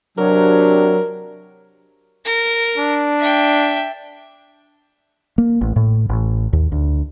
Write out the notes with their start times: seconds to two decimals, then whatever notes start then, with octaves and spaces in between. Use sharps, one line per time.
0.18 C3 F#3 D4 A#4
2.25 A#4
2.78 D4
3.20 E5 G5
5.38 A#3
5.61 A1
5.76 A2
6.09 A1
6.53 D#2
6.72 D2